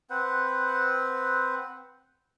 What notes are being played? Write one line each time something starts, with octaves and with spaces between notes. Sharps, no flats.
C4 B4 C5 F#5